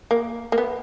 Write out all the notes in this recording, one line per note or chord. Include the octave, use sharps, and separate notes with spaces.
A#3
A#3
B3